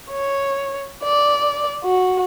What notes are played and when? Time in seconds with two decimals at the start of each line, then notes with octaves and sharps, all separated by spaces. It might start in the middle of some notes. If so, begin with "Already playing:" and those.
0.11 C#5
1.04 D5
1.84 F#4